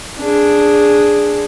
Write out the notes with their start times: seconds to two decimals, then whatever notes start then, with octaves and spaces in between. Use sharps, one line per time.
0.18 D4 G#4